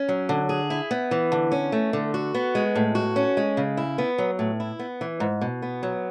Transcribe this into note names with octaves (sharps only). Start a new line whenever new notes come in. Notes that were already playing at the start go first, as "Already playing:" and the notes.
Already playing: C#4
F#3
D3
G#4
E4
B3
E3
D3
C#4
A3
D3
F#4
B3
G#3
A2
F#4
C#4
G#3
C#3
E4
B3
F#3
A2
E4
B3
E3
G#2
B2
B3
F#3